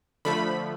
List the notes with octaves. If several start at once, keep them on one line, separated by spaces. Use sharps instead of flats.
D3 F3 A3 B5